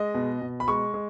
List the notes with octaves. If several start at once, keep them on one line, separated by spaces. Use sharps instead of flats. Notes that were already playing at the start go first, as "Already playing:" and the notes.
Already playing: G#3 D#5
B2
B2
B5
G#3 C#6
G#3